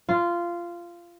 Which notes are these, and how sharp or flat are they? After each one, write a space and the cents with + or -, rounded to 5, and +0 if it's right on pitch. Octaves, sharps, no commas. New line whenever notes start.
F4 -15